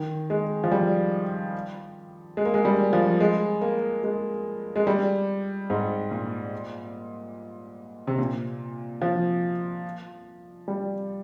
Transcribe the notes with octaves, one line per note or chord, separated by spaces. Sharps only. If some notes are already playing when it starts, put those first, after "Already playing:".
Already playing: D#3
G#3
F3
G3
G#3
A#3
G#3
G3
F3
G#3
A#3
G#3
G#3
G3
G#2
A#2
C3
A#2
F3
G3